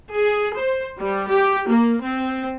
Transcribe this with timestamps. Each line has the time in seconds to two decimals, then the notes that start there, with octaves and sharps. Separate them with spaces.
0.12 G#4
0.55 C5
0.98 G3
1.31 G4
1.70 A#3
2.03 C4